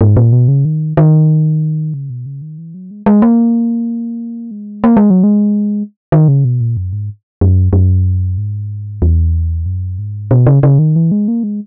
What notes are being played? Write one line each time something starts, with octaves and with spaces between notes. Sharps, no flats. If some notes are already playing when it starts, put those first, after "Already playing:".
G#2
A#2
B2
C#3
D#3
D#3
C#3
B2
C#3
D#3
E3
F#3
G#3
G#3
A#3
G#3
A#3
G#3
F#3
G#3
D#3
C#3
B2
A#2
F#2
G#2
F#2
F#2
G#2
E2
F#2
G#2
B2
C#3
C#3
D#3
E3
G#3
A#3
G#3